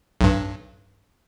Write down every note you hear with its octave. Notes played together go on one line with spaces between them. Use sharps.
B1 G2